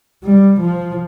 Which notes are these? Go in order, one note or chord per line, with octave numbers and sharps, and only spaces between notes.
G3
F3